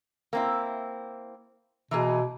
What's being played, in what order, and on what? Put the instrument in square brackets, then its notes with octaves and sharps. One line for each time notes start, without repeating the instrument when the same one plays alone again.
[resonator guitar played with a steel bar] A#3 C4 E4
[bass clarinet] B2 [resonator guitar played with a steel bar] E3 A#3 G#4